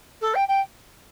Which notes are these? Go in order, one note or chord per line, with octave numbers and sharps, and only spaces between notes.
A4
G5
G5